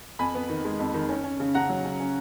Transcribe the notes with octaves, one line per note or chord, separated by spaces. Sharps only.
F2 G#5 B5
B3
D#3
G#3
F2
D#3
C#4
C#4
C#3
C#3 F#5 A#5
F#3
C#3
C#4